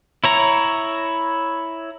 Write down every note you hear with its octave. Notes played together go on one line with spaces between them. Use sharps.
E4 C#5 A#5